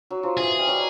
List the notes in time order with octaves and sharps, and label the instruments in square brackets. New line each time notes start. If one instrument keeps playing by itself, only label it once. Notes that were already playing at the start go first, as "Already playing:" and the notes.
[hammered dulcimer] F#3
F3
[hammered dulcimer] E3 [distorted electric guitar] G#4
[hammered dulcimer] G3
F#3